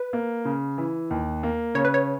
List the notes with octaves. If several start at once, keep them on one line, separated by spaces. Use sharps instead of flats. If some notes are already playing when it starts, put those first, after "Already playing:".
Already playing: B4
A#3
C#3
E3
D#2
A#3
C#3 C#5
B4
C#5